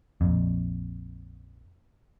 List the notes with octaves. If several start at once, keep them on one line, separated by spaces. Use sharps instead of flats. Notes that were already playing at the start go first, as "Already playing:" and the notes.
A#1 F2